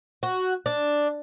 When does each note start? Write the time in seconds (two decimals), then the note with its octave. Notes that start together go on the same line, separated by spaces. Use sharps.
0.23 F#4
0.66 D4